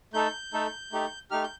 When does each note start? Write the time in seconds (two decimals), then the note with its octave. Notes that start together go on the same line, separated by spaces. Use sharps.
0.14 A3 D#4 A4 G6
0.53 A3 D#4 A4
0.92 A3 D#4 G4
1.31 A3 D#4 G4 F6
1.44 G6